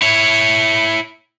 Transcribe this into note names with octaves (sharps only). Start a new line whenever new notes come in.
E4 C#5